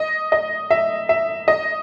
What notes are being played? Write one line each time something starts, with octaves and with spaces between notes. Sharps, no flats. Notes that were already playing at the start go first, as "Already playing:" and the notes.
Already playing: D#5
D#5
E5
E5
D#5